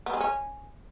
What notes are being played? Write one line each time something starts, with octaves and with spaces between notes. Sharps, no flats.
B3
G#3
C#4